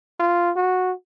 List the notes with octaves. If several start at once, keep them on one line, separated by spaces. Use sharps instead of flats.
F4
F#4